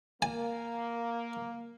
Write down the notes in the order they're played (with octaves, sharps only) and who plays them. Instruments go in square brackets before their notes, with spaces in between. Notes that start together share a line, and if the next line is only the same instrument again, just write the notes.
[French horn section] A#3 [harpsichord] G#5